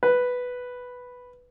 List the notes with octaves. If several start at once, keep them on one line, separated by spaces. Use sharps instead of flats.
B4